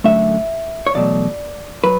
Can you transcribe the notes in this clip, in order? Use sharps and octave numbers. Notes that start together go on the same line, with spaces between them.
F#2 D3 A3 E5
C#5
E2 B2 F#3 A3 D5
F#3 B4